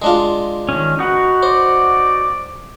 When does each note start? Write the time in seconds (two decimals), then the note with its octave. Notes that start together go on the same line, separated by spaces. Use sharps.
0.02 G#3 D4 F4
0.69 D#3 C#4
0.99 D#4 F#4 B4
1.43 C5 D5